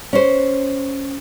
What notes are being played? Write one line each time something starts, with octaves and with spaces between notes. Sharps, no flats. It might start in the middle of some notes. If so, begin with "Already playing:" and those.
C#4 C5